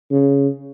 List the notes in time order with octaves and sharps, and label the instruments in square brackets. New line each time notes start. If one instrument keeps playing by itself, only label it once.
[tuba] C#3